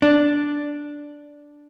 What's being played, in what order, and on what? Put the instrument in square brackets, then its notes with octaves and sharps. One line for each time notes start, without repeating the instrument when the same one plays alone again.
[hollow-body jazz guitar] D4